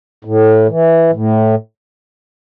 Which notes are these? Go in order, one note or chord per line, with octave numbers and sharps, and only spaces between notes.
A2
E3
A2